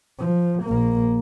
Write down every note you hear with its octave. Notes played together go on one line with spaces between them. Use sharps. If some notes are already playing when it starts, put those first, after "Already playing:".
F3
A#1 A#3